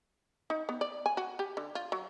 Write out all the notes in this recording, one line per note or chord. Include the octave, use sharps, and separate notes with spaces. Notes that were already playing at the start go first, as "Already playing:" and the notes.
D#4
B3
D5
G#5
F#4
G4
D3
F4
F#3